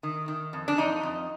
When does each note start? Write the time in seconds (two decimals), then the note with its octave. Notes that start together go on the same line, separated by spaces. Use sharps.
0.03 D#3
0.28 D#3
0.53 F2
0.68 D4
0.78 F2 D#4
1.03 F2